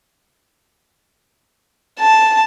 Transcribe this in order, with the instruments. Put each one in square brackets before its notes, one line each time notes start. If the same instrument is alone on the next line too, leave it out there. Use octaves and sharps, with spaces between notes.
[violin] A5